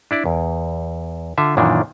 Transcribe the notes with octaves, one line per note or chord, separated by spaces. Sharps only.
D4 E4 D5
E2
D3 F4 E5
F#2 A#2 D#3 E3 D4